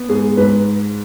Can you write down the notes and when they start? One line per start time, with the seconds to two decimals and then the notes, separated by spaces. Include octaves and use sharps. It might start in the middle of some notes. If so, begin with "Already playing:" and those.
Already playing: B3
0.09 G#2 G#4
0.37 G#2 B4